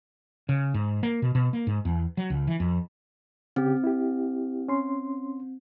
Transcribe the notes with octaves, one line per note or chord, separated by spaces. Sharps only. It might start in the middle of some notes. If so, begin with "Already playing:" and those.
C#3
G#2
A#3
B2
B2
A#3
G#2
E2
F#3
C#2
E3
F2
C#3 C4 G4
E4 G4
C#4 C6